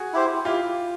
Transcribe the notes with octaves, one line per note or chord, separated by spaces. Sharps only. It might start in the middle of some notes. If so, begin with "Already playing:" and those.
Already playing: F#4 G#4
E4 G4 C5
E4 F4 G4